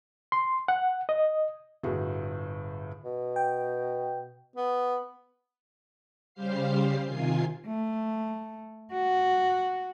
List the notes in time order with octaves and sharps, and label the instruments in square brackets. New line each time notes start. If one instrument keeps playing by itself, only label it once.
[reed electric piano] C6
F#5
D#5
[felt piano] G1 A2 F#4 G#4
[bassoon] B2
[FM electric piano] G5
[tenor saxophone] B3
[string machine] C#3 G3 G4 C5 F5 C7
C3 D#3 F4 G#5 C7
[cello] A3
F#4